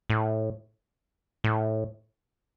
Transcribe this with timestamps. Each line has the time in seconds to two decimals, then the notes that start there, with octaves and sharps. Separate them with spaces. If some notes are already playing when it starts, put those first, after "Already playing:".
0.10 A2
1.44 A2